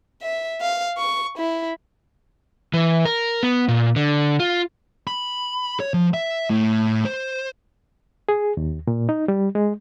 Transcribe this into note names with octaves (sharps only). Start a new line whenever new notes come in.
E5
F5
C#6
E4
E3
A#4
B3
A#2
D3
F4
B5
C#5
F3
E5
A2
C5
G#4
D#2
A#2
D#4
G3
G#3